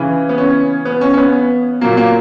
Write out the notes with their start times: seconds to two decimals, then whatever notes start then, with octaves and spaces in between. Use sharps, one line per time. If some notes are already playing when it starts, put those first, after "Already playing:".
Already playing: C#3 E3
0.29 B3
0.38 C#4
0.85 B3
1.01 C#4
1.14 C#4
1.17 B3
1.81 A#2 F#3 A#3
1.97 A#3